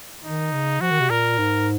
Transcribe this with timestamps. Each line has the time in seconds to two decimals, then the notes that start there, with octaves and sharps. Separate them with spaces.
0.24 D#3 D#4
0.52 C#3
0.81 F3 F#4
0.91 D#3
1.00 C3
1.10 A#2 A#4
1.38 G#2